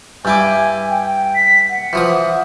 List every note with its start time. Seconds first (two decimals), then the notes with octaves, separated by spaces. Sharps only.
0.25 G2 E4 G#5 D6
0.90 G5
1.35 B6
1.70 F#5
1.93 E3 F3 D#6